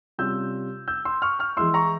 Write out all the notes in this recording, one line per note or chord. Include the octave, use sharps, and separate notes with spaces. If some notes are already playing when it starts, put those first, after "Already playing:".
C3 G3 C#4 F4 E6 G6
E6 G6
C6 E6
C#6 F6
C#6 F6
E3 G#3 E4 C6 E6
A#5 C#6